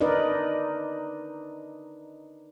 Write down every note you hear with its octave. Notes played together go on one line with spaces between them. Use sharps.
D4 D#4 A#4 B4 D5 D#5